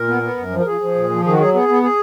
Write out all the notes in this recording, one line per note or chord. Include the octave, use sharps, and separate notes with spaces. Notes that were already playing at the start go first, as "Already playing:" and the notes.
Already playing: A#2 A#4
B3
B3
F#2
F3
A#4
F3 G#4
F3
A#2
F3
D#3 G#4
F#4
F#3 G#4
B3 G#4
B3
G#4